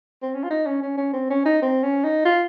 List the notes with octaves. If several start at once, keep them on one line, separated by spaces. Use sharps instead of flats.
C4
C#4
F4
D#4
C#4
C#4
C#4
C4
C#4
D#4
C4
C#4
D#4
F4